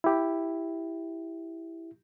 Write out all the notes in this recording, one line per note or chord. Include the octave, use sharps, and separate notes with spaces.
E4 G4